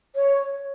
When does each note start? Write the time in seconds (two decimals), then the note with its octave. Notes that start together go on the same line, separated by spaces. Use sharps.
0.16 C#5